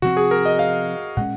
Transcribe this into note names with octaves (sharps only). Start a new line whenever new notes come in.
C3 F3 C4 F#4
G#4
A#4
D#5
F5
A#2 G#3 C#4 F#5